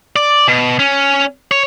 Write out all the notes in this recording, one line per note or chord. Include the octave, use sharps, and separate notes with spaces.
D5
B2
C#4
C#5